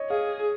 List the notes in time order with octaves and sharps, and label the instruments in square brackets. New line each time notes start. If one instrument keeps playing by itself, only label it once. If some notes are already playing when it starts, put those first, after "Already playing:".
Already playing: [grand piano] C#5 D#5
[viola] G#4 [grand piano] F5